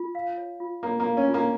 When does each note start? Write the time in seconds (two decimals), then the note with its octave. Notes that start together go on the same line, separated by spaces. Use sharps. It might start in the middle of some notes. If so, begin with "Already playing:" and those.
Already playing: F4
0.15 F5
0.38 C#5
0.60 F4
0.83 A#3 C#5
1.00 A#3
1.06 F5
1.17 C#4
1.28 F4
1.34 A#3